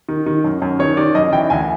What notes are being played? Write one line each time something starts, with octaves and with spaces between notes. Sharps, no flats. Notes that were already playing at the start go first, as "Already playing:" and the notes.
D#3
D#3
F#2
F#2
D#3 C#5
D#3 D5
F#2 D#5
E3 G5
D2 G#5